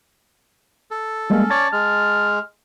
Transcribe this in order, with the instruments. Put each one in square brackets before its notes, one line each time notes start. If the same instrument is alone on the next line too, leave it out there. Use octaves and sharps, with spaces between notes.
[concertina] A4
[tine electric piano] G3 G#3 A#3 [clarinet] C#4
[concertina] C#5 D5 [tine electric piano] A5 A6
[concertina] G#3 [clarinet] F6